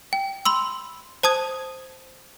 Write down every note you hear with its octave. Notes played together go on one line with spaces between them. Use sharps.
G5
B5 C6 E6
C5 A5 D#6 G#6